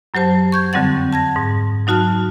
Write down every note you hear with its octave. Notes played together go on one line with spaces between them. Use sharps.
F#2 F#3 G4 C5 A5
C#6 G6 G#6
F2 D3 G3 C4 F#5 A6
A5 G#6 A#6
G#2
F#3 D#4 F#4 A5 F6